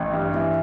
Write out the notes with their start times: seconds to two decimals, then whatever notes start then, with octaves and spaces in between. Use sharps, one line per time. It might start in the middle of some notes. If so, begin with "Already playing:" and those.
Already playing: A1
0.13 G2
0.34 E3